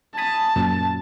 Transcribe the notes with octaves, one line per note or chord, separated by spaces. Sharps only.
G#5 A5 B5 D#6
F#2 A#2